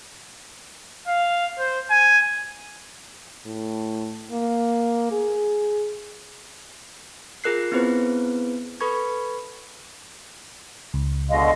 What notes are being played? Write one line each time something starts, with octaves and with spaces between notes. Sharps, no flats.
F5
C5
G#5
A2
A#3
G#4
F4 G#4 A#4 F#6 C7
B3 C4 E4 G#4 B4 C5
A4 B4 B5 C#6 G#6
C#2
B2 D3 G#3 D#5 F5